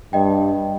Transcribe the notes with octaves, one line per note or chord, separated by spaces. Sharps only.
G2 D#5 G5